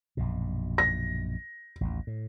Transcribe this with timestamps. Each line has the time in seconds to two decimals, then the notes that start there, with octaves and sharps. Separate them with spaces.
0.17 A#1 F#2 B2
0.78 A#6
1.81 A1 D#2
2.07 A2